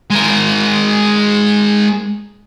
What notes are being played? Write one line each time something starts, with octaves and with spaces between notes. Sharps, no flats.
G#3 A#4